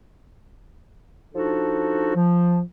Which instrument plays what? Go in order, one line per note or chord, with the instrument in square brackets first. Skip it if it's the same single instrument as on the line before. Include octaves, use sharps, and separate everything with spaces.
[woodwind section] F3 D4 D#4 F#4 A4
F3